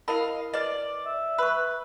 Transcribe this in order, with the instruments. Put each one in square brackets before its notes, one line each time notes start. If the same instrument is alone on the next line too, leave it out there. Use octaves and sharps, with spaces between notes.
[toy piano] E4 A#4 B5 [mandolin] D#5 F5
[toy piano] B4 D#5 [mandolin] D5
[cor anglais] E5
[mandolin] B4 [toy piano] B5 C#6